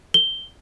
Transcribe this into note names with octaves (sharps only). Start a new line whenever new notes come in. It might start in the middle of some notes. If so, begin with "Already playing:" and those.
G7